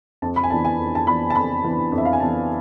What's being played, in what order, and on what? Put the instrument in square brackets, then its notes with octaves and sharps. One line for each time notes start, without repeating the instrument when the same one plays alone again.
[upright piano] F2 A5
B5
G#5
E3 B3 D4 A5
G#5
F2
A5
E3 B3 D4 B5
A5
F2 B5
E3 B3 D4
F2
E5
F5
G#5
E3 B3 D4 A5